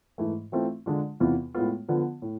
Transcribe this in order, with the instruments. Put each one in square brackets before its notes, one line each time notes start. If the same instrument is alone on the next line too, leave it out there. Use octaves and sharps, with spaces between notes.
[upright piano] G#2 E3 A3
E3 A3 C4 F4
D3 G#3 D4 F4
E2 C3 E3 B3 F4
A2 G#3 B3 F4
D3 F3 B3 F4
A2